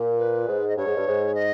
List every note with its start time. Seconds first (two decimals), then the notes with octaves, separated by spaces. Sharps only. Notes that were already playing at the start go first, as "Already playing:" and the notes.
Already playing: A#2
0.18 B4
0.47 G#2
0.68 D#5
0.76 G2 C#5
0.87 G#2
0.96 G2
1.06 G#2
1.35 D#5